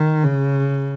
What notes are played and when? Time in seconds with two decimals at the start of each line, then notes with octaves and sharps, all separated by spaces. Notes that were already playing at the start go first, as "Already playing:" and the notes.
Already playing: D#3
0.24 C#3